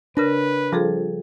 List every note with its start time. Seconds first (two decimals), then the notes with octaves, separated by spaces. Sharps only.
0.17 C#3 D4 A#4 B4 A#6
0.72 F3 G3 G#4 A4